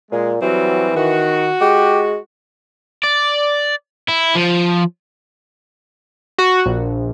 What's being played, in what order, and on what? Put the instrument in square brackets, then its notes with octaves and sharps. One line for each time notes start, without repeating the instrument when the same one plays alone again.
[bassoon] A#2 [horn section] G#3
[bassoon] E3 [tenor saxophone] F#3 [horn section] G3 C4 F#4
[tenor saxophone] D#3 [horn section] F#4
[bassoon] G#3 [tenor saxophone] G4
[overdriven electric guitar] D5
E4
F3
[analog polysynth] F#4
A#1